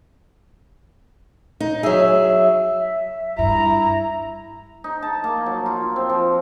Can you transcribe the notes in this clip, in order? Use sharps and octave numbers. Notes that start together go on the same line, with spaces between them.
D#4
F#3 G#4 E5
E5
G2 E4 A#5
D#4
A5
A#3
F#3
F4
C4
F3